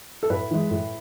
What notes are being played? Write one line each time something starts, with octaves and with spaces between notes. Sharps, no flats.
A4
A2 B4
E3 G#3
A2